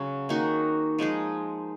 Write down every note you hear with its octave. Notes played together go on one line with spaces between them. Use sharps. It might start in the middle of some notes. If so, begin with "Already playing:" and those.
Already playing: C#3 F#3 C#4 F#4
D#3 A#3 D#4 F#4
F3 G#3 D#4 G#4